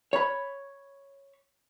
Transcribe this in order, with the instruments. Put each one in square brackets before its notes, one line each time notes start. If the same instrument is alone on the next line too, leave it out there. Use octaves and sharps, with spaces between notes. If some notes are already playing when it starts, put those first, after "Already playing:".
[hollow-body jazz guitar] C#5 B5